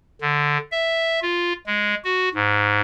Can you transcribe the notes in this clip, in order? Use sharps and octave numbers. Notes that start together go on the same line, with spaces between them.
D3
E5
F4
G#3
F#4
G#2